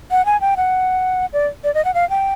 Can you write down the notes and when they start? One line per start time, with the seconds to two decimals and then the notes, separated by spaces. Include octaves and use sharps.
0.11 F#5
0.26 G#5
0.41 G5
0.57 F#5
1.33 D5
1.64 D5
1.75 D#5
1.85 F#5
1.94 F5
2.10 G5